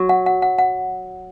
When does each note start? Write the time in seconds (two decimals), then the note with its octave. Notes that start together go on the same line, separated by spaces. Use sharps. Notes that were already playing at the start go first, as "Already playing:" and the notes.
Already playing: F#3 F#4
0.09 F#5
0.26 F#5
0.42 F#5
0.59 F#5